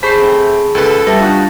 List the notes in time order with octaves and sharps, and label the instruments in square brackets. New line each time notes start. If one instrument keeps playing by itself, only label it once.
[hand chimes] G#4 A5 [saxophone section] C5 [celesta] B5 C#6 [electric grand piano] B6 C7
[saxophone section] C3 A3 C4
[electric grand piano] C#2 B4 [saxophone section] A4
[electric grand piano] G3 [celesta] B4 E5 A5 [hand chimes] A6 A#6
[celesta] D4 F4 [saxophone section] D#4 F#4 [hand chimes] F5 A5